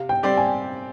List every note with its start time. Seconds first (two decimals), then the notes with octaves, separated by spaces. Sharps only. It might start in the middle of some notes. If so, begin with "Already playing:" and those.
Already playing: C3 F5
0.09 G5
0.23 G3 C4 G4 D5
0.37 G#5